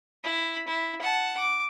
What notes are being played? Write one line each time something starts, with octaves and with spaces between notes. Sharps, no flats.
E4 B5
E4
F#5 A5
D6